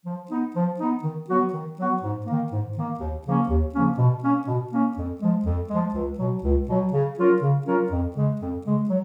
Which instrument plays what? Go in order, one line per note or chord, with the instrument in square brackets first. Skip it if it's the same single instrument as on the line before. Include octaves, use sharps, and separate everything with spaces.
[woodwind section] F3
B3 D#4
F3
B3 D#4
D#3
F#3 B3 F#4
D#3
F#3 B3 F#4
G#2
D#3 A#3
G#2
D#3 A#3
D#2
C#3 F3 A#3 C#4
D#2
C#3 F3 A#3 C#4
B2
A#3 C#4
B2
A#3 C#4
F2
F3 G#3
F2
F3 G#3
C#2
B2 F#3
C#2
B2 F#3
C#3
F#3 C#4 F4 A#4
C#3
F#3 C#4 F4 A#4
F2
C#3 G#3
F2
C#3 G#3
F#3